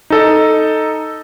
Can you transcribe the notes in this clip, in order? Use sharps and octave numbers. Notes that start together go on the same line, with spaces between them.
D#4 A4 D#5